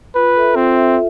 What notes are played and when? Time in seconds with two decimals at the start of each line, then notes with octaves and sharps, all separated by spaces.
0.15 F4 B4
0.36 A4 E5
0.56 C4 F4
0.76 A4 E5